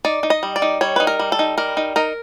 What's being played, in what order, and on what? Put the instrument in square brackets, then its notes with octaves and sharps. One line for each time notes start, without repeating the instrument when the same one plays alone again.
[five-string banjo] D#4 D5
D#4
D#5
G3
D5
D#4
G3 C#5
D#4 B4
A#4
G3
A4
D#4
G3 A#4
D#4
D#4 A#4